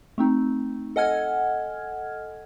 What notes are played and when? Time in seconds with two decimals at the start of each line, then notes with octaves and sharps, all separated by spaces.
0.18 A3 C4 D#4
0.96 A4 D#5 F#5 G#5 F6 G#6